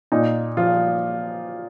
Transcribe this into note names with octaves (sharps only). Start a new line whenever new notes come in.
A#2 D#4
F3 F4